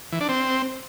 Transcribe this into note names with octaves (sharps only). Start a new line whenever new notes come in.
E3
D4
C4